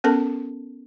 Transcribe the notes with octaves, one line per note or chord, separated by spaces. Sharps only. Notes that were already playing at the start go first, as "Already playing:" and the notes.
B3 C#4 A4 A#4 A5